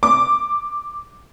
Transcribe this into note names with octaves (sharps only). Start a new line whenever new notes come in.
D6